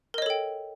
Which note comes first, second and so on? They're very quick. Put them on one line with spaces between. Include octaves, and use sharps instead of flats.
A#4 D#5 C#5 A4 G5